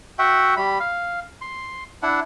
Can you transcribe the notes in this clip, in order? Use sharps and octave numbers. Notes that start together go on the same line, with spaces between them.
F#4 E5 F#5 G5
G3 B5
F5
C6
D4 E4 F#5